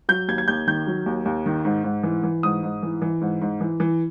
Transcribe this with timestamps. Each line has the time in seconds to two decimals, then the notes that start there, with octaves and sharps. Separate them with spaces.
0.09 F#3 G6
0.28 D#2 G#6
0.38 G#6
0.48 D#2 G6
0.67 D#3 G6
0.87 F#3
1.06 D#2
1.25 D#2
1.46 D#3
1.65 G#2
1.84 G#2
2.03 E3
2.23 E3
2.43 G#2 D#6
2.63 G#2
2.83 E3
3.02 E3
3.21 G#2
3.41 G#2
3.61 E3
3.80 E3